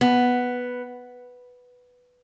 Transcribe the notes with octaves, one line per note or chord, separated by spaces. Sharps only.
B3